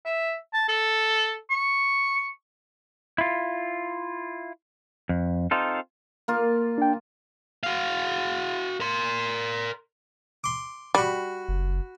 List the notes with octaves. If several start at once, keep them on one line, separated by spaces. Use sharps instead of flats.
E5
A5
A4
C#6
E4 F4
F2
C4 D#4 F4 A4
A#3 F4
D4 G5
F#4 F5
A#4 C6
C6 D6
G3 F#4 B5
F#1